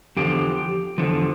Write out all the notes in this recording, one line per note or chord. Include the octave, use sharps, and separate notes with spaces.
E2 D3 F3 G4
E2 D3 F3